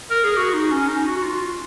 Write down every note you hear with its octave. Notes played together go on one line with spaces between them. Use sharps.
A#4
G#4
F#4
D#4
C#4
D#4
F#4
F#4
F4